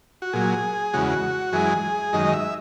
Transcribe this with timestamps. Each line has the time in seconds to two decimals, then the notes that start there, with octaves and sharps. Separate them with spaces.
0.22 F#4
0.33 A#2 F#3 G#4
0.94 E2 C#3 G#3 F#4
1.53 F#2 E3 G#3 G#4
2.13 F#2 D#3 G#3 D#5
2.33 E5